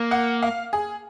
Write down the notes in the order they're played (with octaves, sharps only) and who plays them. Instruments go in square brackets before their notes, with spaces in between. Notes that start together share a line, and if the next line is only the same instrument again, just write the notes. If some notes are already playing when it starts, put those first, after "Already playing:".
Already playing: [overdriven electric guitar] A#3
[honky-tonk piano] F#5
F5
G#4